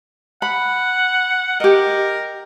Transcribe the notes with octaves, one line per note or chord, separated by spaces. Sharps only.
F#5 B5
G4 A#4 D#5